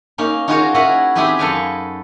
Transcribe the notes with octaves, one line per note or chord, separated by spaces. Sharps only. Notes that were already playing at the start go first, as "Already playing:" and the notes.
A#3 C#4 D#4
D#4 F4 F#4 G#4 A#4 C#5
C#4 E4 F#4 A#4 B4 F#5
C4 D#4 E4 G4 G#4 B4
F#2 A4 B4 F5 G5 G#5